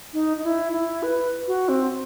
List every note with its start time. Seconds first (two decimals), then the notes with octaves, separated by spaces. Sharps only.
0.13 D#4
0.37 D#4
0.44 E4
0.72 E4
1.03 B4
1.47 F#4
1.69 C4